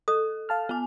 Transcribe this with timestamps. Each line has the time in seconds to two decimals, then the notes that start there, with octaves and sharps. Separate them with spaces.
0.08 A4 D#6
0.49 F5 A5 F6
0.69 B3 G#5